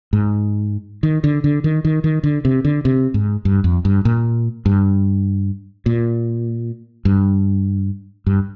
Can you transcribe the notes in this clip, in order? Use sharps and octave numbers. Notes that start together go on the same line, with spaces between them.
G#2
D#3
D3
D3
D#3
D#3
D#3
D3
C3
D3
C3
G#2
G2
F2
G2
A#2
G2
A#2
G2
G2